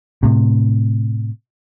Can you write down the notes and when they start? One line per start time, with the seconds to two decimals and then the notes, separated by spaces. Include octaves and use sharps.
0.23 A2 C3